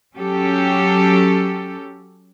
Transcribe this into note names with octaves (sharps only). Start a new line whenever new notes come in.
F#3 C#4 G4 A4